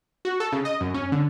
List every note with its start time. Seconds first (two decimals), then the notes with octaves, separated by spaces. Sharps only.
0.25 F#4
0.40 A4
0.52 C#3
0.65 D#5
0.81 F#2
0.94 C#4
1.12 D3